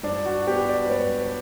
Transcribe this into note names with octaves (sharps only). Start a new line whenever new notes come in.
G2 D4
F#4
B3 G4
D5
B4
G2 C#5
C#5